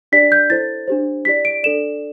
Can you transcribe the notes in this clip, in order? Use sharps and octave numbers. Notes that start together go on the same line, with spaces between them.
D4 G4 D5 B6
G6
E4 A4 C5 A6
D4 G4 C5
E4 G4 D5 B6
D7
D4 A4 D5 E7